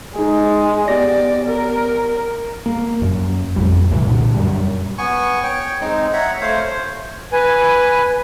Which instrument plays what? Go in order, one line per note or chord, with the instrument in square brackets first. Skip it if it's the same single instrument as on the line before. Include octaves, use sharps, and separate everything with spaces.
[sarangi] G#3 [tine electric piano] D#4 G#4
[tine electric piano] B3 G4 A#6 [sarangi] D5
[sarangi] A#4
[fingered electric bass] A#3
F#2
A1 F2 G3
C2 A2 C3 E3
A#2 D3
F#2 G3
[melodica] B3 G#5 C#6
C#5 G5
G#3 C4 D#4
C#5 E5 F#5 A#5
A3 C5 C#5 F5
C5
[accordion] B4 G#5